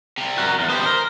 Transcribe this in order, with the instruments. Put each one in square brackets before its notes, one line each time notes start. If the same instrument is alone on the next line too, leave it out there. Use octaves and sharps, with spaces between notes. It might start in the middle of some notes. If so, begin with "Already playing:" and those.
[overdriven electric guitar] C3 G3
[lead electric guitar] F#4 A#4
E2
[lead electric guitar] B3 G4 [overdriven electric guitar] C5
[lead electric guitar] A#4